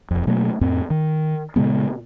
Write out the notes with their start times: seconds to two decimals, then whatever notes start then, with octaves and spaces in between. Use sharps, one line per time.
0.11 E1 F2
0.27 B2 F#3 A3 A#3
0.61 F2 A2 C4
0.90 D#3
1.56 A#2 C#3 G#3 B3